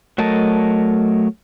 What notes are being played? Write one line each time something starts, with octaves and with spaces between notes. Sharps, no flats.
F#3 A3 A#4 D#5 A5